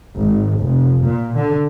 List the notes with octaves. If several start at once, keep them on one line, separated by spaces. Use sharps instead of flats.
G#1
F1
A#2
D3